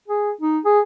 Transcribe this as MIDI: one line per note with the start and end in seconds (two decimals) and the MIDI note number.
0.08 0.31 68
0.41 0.59 63
0.65 0.80 68